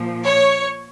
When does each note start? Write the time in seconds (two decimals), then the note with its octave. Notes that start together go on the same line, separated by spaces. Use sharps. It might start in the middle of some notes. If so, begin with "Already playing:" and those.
Already playing: A#2 F3
0.25 C#5